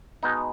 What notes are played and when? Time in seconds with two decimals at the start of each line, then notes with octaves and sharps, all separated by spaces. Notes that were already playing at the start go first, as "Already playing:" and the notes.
0.23 B2 G#3 B3 D#4